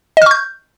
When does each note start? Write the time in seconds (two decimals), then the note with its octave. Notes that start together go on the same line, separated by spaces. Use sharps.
0.17 D#5
0.22 F6
0.26 C#6
0.31 G6